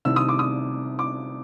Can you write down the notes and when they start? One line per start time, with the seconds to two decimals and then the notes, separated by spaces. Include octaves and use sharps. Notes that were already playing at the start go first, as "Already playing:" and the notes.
0.05 C2 C3 D#3 E6
0.16 D#6
0.29 D6
0.39 D#6
0.99 D6